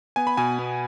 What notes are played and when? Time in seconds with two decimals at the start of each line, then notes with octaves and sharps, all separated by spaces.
0.16 B3 G#5
0.27 B5
0.37 B2 G#5
0.59 B3